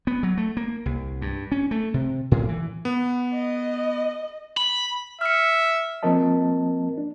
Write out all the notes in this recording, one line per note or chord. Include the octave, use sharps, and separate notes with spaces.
B3
F#3
A3
A#3
C2
G2
C#4
A3
C3
A2
E3
B3
D#5
B5
E5 F6 C#7
F3 A#3 C4 A#4 D#5 A5
D4